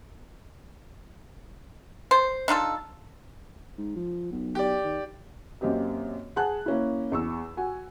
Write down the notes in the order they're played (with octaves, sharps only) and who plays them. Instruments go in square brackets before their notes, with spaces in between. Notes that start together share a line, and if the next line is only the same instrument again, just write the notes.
[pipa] C5
D4 D#4 F4 A4
[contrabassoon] G#2
F3
B1
[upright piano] G4 D5
[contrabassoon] D#3
[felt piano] F#2 A#3 C4 G4 D#5
G#4 F#5 G#5 A5 F#6
A#3 C#4 E4
E2 C#6 E6
F#4 F#5 G#5